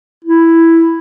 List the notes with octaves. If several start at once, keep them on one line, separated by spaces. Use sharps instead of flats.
E4